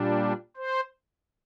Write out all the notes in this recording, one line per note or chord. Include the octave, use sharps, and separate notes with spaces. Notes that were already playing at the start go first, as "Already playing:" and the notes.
Already playing: A#2 G3 D4
C5